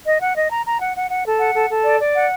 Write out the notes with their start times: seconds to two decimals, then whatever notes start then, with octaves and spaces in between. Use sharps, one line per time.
0.06 D#5
0.21 F#5
0.36 D#5
0.51 A#5
0.66 A#5
0.80 F#5
0.96 F#5
1.10 F#5
1.26 A4
1.39 F#5
1.54 A4
1.70 A4
1.85 D5
2.00 D5
2.15 F#5